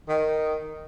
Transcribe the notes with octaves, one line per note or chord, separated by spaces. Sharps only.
D#3